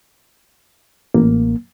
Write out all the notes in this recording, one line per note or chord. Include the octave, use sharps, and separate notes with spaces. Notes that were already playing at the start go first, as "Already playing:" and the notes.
A1 A#3